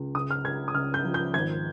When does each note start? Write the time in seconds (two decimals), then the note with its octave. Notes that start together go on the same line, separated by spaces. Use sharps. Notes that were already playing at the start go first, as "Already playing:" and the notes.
Already playing: C#2
0.15 C#3 D#6
0.31 F6
0.44 C#2 G#6
0.68 D#6
0.75 C#2 F6
0.94 G6
1.05 F3
1.14 G6
1.34 G#1 G#6